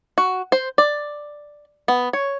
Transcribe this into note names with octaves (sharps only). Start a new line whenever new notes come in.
F#4
C5
D5
B3
C#5